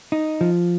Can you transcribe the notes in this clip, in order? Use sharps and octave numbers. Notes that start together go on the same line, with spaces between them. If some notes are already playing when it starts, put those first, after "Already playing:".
D#4
F3